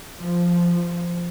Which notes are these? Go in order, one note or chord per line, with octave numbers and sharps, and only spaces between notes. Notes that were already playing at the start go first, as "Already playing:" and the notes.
F3